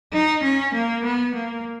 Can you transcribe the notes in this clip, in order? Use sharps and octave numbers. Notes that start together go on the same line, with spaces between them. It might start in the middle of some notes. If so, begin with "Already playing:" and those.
D#4
C#4
A#3
B3
A#3